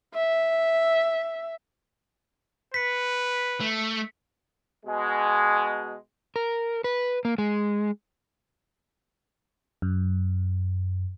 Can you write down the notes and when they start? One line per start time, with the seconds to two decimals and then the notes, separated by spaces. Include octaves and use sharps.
0.15 E5
2.74 B4 B6 C#7
3.60 A3
4.86 B2 G#3
6.36 A#4
6.84 B4
7.25 A#3
7.38 G#3
9.82 F#2